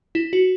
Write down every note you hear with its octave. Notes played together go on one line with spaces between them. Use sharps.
E4
F#4